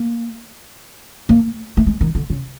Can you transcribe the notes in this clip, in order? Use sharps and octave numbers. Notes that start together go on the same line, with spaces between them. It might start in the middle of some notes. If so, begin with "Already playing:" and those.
Already playing: A#3
A#3
A3
G#3
D#3
D3
C#3